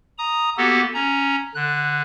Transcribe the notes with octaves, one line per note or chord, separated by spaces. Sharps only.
A#5 D#6
A#3 B3 F#4 G4 A4
C#4 A#5
D3 F#6